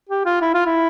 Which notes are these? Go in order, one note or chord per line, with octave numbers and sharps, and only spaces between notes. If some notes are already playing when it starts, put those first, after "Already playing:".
G4
F4
E4
F4
E4